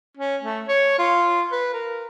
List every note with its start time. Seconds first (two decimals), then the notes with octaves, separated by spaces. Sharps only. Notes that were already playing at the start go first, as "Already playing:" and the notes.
0.17 C#4
0.43 A3
0.68 C#5
0.98 F4
1.52 B4
1.73 A#4